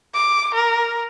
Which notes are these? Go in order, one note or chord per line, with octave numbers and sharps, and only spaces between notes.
D6
A#4